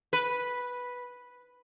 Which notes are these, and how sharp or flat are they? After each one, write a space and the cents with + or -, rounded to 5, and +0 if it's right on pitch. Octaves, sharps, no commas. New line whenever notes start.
B4 -5